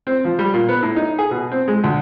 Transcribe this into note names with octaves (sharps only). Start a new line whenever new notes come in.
C4
F3
G3
A#2
B3
A2
D#4
G#4
B2
C4
G#3
D2